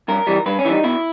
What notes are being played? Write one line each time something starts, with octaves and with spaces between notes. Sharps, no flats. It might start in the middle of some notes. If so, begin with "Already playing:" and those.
G2 A#4
E3 G3
G2 B4
C#4
E3 G3 D#4 E4
B2 E4